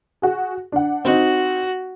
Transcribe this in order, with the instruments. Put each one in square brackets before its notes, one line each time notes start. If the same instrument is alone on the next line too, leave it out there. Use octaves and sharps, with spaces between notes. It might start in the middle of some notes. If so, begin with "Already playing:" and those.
[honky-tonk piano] F#4 G#4
D4 F#5
[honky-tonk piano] C4 D#4 [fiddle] F#4